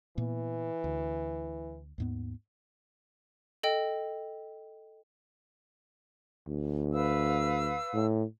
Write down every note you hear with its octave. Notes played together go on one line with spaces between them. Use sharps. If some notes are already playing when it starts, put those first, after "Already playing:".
A#2 E3 A#3 B3
D2
D#2 G#2 B3
A4 D#5 G5
D2
B4 F5 E6
A2